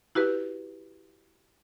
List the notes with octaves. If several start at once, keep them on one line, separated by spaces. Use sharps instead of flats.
E4 F#4 G4 B4